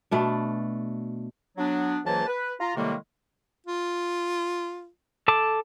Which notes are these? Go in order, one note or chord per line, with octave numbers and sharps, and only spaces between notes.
B2 A3 D4
F#3 B3 D4
C#2 E3 F#3 A#3 C5 A5
B4
F4 A#5
A2 C3 D#3 G3 G#3 A#3
F4
A4 A5 D6